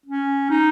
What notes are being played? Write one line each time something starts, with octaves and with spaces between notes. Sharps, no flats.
C#4
D#4